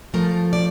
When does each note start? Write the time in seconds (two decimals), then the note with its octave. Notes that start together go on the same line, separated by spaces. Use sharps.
0.13 C#3 F3 A3 A#4
0.53 D5